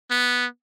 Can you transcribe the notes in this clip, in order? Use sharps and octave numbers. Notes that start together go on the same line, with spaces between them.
B3